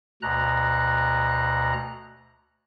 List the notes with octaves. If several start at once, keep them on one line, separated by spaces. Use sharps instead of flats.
D2 B2 A#5 F#6